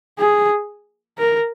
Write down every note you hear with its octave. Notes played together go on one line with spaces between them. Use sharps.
G#4
A#4